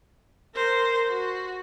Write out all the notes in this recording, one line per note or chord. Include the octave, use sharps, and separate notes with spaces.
A#4 C5
F#4